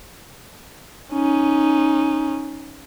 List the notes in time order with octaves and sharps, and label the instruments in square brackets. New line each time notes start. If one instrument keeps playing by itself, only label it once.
[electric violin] C#4 D#4